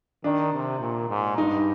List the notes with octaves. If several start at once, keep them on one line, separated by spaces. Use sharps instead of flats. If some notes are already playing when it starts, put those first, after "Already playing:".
D#3 D4
C3
A#2
G#2
G2 D#4